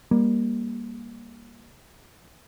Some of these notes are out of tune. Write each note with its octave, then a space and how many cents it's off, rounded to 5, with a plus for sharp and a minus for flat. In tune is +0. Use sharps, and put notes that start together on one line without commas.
G3 +35 A#3 +20